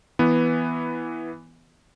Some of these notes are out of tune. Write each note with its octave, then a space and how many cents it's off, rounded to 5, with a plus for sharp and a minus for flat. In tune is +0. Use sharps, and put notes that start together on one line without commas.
E3 +0 B3 +0